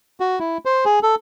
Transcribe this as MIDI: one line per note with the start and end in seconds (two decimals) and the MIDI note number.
0.20 0.39 66
0.39 0.58 64
0.65 0.85 72
0.85 0.99 68
1.03 1.15 69